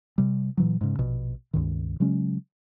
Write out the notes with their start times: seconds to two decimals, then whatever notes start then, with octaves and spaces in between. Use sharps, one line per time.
0.18 C3 G3
0.57 A#2 E3 F#3
0.81 G#2 C#3
0.99 A#1 B2
1.53 C#2 G2 D#3
2.00 C#3 F#3 G#3 C#4